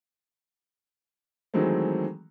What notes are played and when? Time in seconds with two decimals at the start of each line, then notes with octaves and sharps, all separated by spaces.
1.54 D#3 E3 F#3 G#3 A3 C4